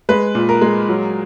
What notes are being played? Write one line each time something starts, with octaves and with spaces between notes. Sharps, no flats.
G#3 B4
A#2
A#4
G#3
F#3